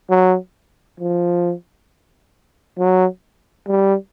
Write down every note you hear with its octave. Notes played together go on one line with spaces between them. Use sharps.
F#3
F3
F#3
G3